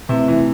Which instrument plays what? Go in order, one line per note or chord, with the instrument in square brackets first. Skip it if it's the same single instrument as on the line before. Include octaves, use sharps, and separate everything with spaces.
[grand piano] C3 [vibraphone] A3 C4 E4 B4
[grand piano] E3